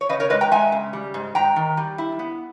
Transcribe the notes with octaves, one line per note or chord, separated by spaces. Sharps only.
C#5
C#3 B4 D#5
A#4 C#5
G#3 B4 D#5
G5 A#5
G#3 E5 G#5
C#3
G3
G#2
G#2 G5 A#5
D#3
G3
E4
B3